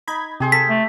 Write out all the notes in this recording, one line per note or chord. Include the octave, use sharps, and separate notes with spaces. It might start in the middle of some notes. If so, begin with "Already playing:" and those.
D#4 B5 G#6
C3 G4 G#4 C5
A4 B6
A3